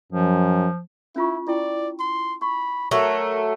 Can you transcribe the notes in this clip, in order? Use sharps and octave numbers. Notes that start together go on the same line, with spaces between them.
F#2 F3
C#4 E4 F4 C#6
E4 D5 G5
C6
B5 C#6
F#3 A3 A#4 C#6